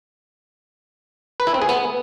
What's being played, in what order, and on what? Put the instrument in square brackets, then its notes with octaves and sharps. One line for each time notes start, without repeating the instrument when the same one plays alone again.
[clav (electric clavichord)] B4
E4
C4
G#4
B3